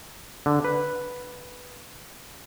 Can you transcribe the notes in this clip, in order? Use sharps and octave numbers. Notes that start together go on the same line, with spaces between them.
D3
B4